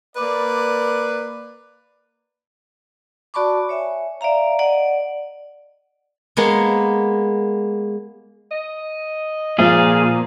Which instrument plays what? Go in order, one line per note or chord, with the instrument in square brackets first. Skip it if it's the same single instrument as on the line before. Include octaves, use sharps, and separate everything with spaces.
[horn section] A#3 B4 D5
[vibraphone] F#4 D5 A5 B5 C#6 D6
C#5 E5 G#5
D5 E5 F5 A#5
D5 D#5 F#5
[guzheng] G#3 A#3 B3
[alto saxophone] D#5
[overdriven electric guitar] A#2 [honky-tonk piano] F3 A#3 [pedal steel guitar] G#4 [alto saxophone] F5